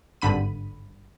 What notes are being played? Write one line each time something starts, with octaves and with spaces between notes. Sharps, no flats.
G#1 G2 D3 B5 D#7